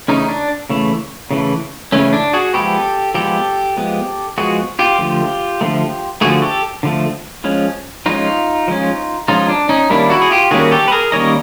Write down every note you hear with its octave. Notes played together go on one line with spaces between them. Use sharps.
C#3 E3 A3 C#4 D#4
D4
C#3 E3 A3
C#3 E3 A3
C#3 E3 A3 C#4
D4
F#4 G#4
F3 G#3 B3 G4 A4
F3 G#3 B3 G4 A4
F3 G#3 B3
F3 G#3 B3 F#4 G#4
F4 G4
D3 F3 A3
D3 F3 A3
D3 F3 A3 F#4 G#4
G4 A4
D3 F3 A3
F3 G#3 C#4
F3 G#3 C#4 D#4 F4
F3 G#3 C#4
F3 G#3 C#4 D#4 F4
D4
C#4 D#4
D#3 G3 A#3 C#4 D4 E4
E4 F#4
G#4
F4 G4
D#3 G3 A#3 C#4 F#4 G#4
G4 A4
B4
G#4 A#4
D#3 G3 A#3 C#4 C#5 D#5